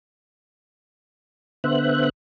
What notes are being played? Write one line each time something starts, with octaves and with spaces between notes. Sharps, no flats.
D3 B3 C5 E5 F#6